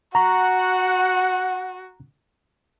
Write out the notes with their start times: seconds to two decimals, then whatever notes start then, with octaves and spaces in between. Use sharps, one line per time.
0.15 F#4 F#5 A#5 C#6